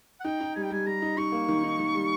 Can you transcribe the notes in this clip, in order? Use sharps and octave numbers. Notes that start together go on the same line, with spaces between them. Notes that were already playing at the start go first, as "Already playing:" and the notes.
F#5
D#4 G5
D#4
G3 G#5
G5
G3 G#5
G3 A#5
D#4
D#4 C#6
A#3
D#3
D#4
D#3
G3